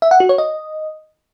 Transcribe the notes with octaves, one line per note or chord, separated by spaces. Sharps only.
E5
F#5
F#4
C#5
D#5